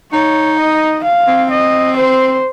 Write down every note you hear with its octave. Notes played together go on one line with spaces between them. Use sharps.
D#4 C#5
D#5
F5
C4
D#5
C5